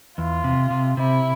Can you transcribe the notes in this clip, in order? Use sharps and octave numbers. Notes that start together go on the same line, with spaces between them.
E2 F4
C3
C3
C3 E4